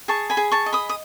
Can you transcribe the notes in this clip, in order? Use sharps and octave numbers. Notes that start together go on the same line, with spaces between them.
G#4 A5 C#6
G#5 B5
G#4
A5 C#6
D#5
B5 D#6
D#6